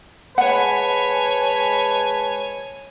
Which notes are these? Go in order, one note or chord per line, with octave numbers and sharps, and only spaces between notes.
G#3 B4 C#5 F#5 G#5 A5